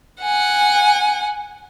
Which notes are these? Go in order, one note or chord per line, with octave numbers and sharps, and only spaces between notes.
F#5 G#5